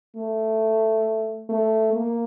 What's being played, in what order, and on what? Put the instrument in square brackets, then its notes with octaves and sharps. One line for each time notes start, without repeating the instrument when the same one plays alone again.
[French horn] A3
A3
A#3